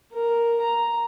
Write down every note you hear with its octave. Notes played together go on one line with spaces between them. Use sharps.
A#4
A#5